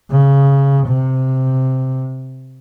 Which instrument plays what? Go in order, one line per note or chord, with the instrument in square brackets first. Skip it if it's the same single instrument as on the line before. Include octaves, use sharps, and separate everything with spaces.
[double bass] C#3
C3